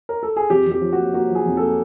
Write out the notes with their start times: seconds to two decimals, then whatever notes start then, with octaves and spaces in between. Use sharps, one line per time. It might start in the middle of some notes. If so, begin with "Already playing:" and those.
0.09 A#4
0.23 A4
0.36 G#4
0.50 F2 G4
0.67 F2 G4
0.81 F3
0.93 F#4
0.98 A#3
1.14 A#3 F#4
1.30 F3
1.35 G#4
1.46 F2
1.57 A4
1.62 A#3